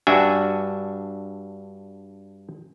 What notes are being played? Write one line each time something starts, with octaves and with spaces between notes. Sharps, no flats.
G2 D4 F#4 E5 G#5